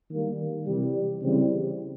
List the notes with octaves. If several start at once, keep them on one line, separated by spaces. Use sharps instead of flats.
D#3 G3 A#3
C3 E3 G3
C#3 E3 G3 C4 E4